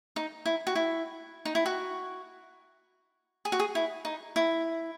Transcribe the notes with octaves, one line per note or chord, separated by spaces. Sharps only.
D#4
E4
F#4
E4
D#4
E4
F#4
G#4
F#4
G#4
E4
D#4
E4